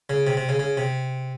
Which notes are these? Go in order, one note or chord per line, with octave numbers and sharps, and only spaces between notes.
C#3
C3
C3
C#3
C#3
C3